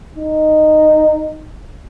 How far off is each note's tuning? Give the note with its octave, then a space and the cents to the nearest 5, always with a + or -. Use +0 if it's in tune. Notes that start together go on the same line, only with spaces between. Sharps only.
D#4 -10